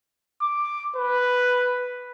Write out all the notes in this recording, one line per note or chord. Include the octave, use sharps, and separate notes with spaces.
D6
B4